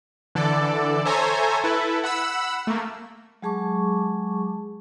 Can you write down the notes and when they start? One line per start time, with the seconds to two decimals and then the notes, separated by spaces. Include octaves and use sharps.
0.35 D3 E3 A4 D5
1.05 A4 C5 C#5 E5 G#5 A#5
1.64 E4 A4 B4
2.03 F#5 B5 E6
2.67 A3 A#3
3.42 F#3 G#3 G#4 A5 C#6 D6